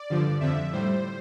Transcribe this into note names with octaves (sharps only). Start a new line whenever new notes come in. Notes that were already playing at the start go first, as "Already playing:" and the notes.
Already playing: D5
G2 D3 F3
F2 D3 F3 E5
A2 G3 C5